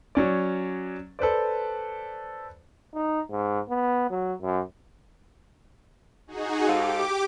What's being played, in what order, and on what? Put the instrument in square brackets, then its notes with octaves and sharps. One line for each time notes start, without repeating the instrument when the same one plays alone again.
[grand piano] F#3 C#4 D5
A4 B4 C5 D5
[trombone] D#4
G#2
B3
F#3
F#2
[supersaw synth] D#4 F#4 G#4
[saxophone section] G#2 A4 F5 [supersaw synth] G4 D6